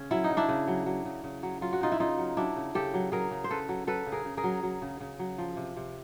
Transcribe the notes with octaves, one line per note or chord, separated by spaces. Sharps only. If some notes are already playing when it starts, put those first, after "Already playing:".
Already playing: C#3 C#4
F#3 E4
D#4
C#3
D4 E4
C#3
F#3
F#3
C#3
C#3
F#3
F#3 F4
F#4
C#3 D#4 F4
E4
C#3 D#4 F4
F#3
F#3 D4 E4
C#3
C#3 G4 A4
F#3
F#3 G#4 A#4
C#3
C5
C#3 A4 B4
F#3
F#3 A4 B4
C#3
G#4 A#4
C#3
G#4 A#4
F#3
F#3
C#3
C#3
F#3
F3
C3
C3